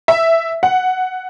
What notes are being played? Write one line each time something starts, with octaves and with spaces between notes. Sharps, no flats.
E5
F#5